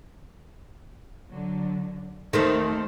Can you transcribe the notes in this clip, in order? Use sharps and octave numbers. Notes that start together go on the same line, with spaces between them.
D3 F#3
D#2 D#3 A3 C4 A4 C5